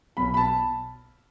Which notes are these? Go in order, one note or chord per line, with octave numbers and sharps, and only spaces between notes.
B1 B2 B5
B5
A5